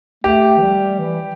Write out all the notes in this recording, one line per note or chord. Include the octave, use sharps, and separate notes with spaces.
A3 G4
E3
G3
E3